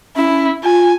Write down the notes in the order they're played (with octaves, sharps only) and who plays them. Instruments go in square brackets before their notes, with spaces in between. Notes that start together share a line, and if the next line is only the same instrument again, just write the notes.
[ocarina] C#4 [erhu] E4
[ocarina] F4 [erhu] G#5